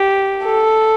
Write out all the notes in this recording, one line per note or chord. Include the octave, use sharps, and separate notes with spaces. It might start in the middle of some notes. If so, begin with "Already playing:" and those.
Already playing: G4
A4